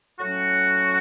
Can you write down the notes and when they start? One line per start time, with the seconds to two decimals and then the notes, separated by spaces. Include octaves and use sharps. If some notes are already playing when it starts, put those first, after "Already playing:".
0.20 A2 F#3 C#4 F#4